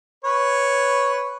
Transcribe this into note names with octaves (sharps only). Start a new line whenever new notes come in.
B4 C#5